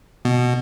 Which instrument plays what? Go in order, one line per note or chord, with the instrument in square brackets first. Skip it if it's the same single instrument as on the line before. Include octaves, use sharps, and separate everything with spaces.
[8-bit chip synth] B2